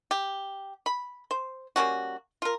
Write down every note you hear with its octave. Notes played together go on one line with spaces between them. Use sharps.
G4
B5
C5
G3 A#3 C#4 F#4
F4 A#4